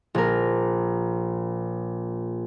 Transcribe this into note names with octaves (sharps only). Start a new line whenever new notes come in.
A#1 A#4